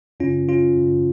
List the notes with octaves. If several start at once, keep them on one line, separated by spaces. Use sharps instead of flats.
F#2 C#3 C#4 F4
C#4 F4
F#2 C#3